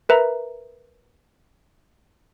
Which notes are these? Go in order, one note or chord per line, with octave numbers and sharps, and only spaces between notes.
A#4 B4 E5 A#5